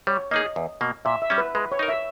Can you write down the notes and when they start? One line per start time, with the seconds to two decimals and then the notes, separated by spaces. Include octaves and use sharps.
0.07 G3 C#5
0.31 A#3 D#4 G#4 D#5
0.56 E2
0.81 B2 A#3
1.05 A#2 E5
1.22 E5
1.30 G3 C#4
1.38 B4
1.55 G#3 B4
1.72 C#5
1.79 D#4 A#4
1.88 E5